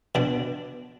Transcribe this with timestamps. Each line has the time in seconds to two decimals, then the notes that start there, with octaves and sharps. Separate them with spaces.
0.15 B2 D4